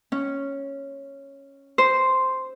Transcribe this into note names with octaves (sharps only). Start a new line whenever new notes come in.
C#4
C5